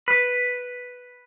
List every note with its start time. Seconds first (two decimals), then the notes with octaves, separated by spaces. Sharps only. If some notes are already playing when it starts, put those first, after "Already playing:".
0.08 B4